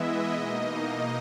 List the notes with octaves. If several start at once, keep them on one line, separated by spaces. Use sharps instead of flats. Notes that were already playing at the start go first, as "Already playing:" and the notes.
Already playing: E3 G#3 B3 E4 D#5 E5
B2 A#3 D#4